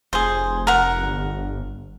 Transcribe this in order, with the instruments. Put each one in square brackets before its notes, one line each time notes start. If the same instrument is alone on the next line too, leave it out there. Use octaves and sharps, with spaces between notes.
[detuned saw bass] F1 [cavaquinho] G#4 C5
[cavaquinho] A#4 F#5
[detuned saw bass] G1